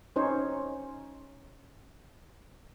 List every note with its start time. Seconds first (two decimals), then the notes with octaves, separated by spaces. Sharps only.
0.16 C#4 D#4 C5 C#5